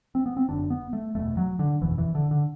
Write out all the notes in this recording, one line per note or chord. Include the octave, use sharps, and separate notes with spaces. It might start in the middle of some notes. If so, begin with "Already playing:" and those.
C4
B3
C4
F#1 F#2 D3 D4
B3
A3
F#1 E2 B2 A3
F#3
D3
F#1 E2 B2 E3
E3
D3
D3